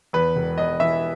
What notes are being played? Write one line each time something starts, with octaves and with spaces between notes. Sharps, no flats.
E2 B4
E1
E2 D#5
E3 E5